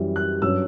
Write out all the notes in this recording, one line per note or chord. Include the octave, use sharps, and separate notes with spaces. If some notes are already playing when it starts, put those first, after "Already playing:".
Already playing: F#2 E3 G3
F#6
G2 F#3 C#4 E6